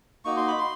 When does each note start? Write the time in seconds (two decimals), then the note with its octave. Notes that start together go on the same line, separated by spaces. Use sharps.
0.25 A#3 D#4 F#4 C#6
0.37 C6
0.48 B5
0.59 C6